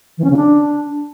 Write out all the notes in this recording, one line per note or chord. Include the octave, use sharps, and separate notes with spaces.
E3
C#4
C#3
D4